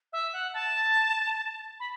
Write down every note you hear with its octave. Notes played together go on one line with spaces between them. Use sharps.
E5
F#5
A5
B5